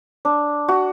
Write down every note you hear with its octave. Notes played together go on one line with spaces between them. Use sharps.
D4
F#4